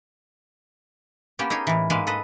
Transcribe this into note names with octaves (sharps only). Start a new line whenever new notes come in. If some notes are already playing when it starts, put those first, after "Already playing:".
A#3 B3 C#4 G4
D#4 G4 G#4 C#5
A2 E3
G#2 G#3 A#3 B4 F5
A4 B4 D#5